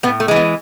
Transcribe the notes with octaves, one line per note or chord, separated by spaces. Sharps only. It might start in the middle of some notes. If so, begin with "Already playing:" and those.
A2 B3
A3
E3 G#3
B3